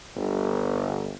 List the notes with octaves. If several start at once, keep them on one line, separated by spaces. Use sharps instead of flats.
G1